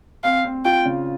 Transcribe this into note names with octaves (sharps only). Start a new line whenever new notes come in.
C4 F5
C4
F4 G5
C#3